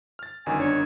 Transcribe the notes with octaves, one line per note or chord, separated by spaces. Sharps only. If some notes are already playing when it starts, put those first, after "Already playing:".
F6 A6
G1 F#2 D#3 G#5
D4 C#5